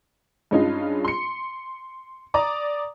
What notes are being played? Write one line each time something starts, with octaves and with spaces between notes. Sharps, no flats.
G2 G#3 C#4 D#4 F4
C6 C#7
D5 A#5 D6 D#6